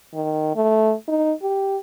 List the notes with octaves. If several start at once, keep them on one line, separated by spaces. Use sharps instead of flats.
D#3
A3
D#4
G4